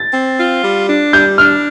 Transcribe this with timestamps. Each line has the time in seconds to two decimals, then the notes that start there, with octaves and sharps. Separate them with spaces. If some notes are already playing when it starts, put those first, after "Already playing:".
Already playing: A6
0.14 C4
0.38 F4
0.63 G3
0.88 D4
1.13 G3 G6
1.38 D4 F6